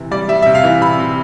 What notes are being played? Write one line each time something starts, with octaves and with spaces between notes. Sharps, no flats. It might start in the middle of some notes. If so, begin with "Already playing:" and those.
Already playing: C3 E3
G3 D5
G3 E5
C3 E5
F5
E3
C3 B5
C3